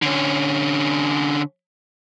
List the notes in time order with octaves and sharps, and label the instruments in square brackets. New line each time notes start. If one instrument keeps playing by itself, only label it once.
[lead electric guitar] D3 C#4